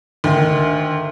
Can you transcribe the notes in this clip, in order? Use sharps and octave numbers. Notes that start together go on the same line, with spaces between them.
D2 D#3